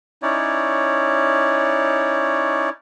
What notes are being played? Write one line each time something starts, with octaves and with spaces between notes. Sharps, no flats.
C#4 D#4 E4 C#5 D5